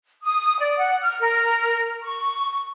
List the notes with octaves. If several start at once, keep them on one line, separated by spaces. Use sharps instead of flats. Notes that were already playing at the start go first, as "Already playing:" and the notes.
D#6
D5
F#5
F6
A#4
C#6